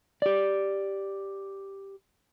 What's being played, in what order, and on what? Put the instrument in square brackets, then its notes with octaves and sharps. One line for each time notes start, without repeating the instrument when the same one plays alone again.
[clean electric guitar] G4 D5